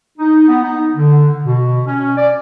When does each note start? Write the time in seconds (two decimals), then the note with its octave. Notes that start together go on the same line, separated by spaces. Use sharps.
0.18 D#4
0.48 B3
0.63 D#4
0.96 D3
1.44 B2
1.87 C#4
2.17 D5